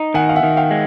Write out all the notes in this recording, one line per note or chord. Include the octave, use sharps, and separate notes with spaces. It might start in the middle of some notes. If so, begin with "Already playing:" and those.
Already playing: D#4
D#3 F#5 G#5
F5
E5 F#5
D#3
F5 G5
G#3